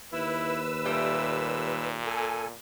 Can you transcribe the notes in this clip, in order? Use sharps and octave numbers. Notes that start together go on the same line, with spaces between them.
D#2 E4 B4 E6
A#2 G3 A3
A4 G#5